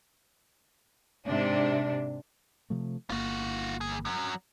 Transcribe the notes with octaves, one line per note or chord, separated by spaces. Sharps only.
G#2 C3 D4
C3 F3 A3
G1 A#3 F4 F#4
E2 G#4
F#2 F#3